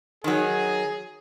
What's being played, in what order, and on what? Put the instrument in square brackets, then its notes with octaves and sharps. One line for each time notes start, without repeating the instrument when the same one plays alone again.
[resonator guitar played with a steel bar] D#3 F#3 [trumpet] G#4